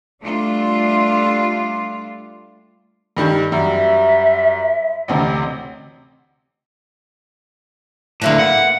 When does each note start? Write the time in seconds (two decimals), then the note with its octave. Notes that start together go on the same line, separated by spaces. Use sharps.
0.21 G3 A3 D4 F4
3.17 G2 D#3 G3
3.52 F#2 G3 E5
5.08 A1 D2 C3
8.22 A2 D3 A#3 E4 B4
8.39 F#5